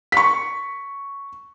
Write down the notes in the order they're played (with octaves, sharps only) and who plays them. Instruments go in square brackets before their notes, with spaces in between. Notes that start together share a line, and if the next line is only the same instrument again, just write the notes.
[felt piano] C#6 B6